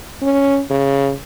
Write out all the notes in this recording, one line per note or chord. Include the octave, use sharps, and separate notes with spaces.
C#4
C#3